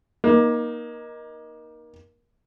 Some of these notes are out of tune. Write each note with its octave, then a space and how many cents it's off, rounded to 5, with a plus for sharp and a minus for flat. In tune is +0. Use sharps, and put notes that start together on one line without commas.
A#3 +25 D#4 +0